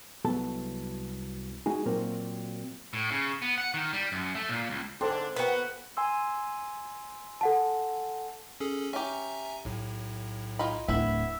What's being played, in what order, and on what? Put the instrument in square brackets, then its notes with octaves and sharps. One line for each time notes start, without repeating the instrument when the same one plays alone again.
[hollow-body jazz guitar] C2 F#3 B3 A4
G#3 D#4 F#4 G#4
A#2 F#3 A#3 C4
[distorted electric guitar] A2
C#3
B3
F#5
D#3
G3
F#2
A3
A#2
C#2
[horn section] G#2 D3 D4 [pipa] C4 [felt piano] A4 C5
[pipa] A#3 G5 [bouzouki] B3 F#4 [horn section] B4 F#5
[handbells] G#5 C6 E6
[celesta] A4 F#5 A5
[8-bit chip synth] C#4 G#4 A4
[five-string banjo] C#4 G4 [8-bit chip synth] E5 G#5 A#5
[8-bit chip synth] B1 A2
[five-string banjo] D#4 F4 B5
[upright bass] D1 [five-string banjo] B3 E4 [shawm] E5